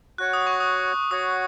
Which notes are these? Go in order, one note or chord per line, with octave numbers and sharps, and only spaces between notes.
F#4 C#5 F#5 F#6
D#6
C#6
D#6
F#4 C#5 F#5 D#6